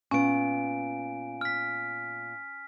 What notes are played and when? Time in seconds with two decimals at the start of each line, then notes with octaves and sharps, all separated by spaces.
0.11 A#2 B3 C#4 G#5 D7
1.41 F6 B6